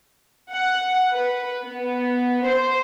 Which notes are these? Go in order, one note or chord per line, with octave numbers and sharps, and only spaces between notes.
F#5
B4
B3
C5